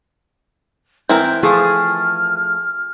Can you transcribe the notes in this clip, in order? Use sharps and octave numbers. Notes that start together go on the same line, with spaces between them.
G#2 E3 C4 A#4 G6
F3 A3 G#4 F6